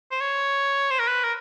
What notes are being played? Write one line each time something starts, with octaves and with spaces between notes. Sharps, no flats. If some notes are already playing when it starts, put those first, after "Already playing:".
C5
C#5
C5
A#4
B4
A#4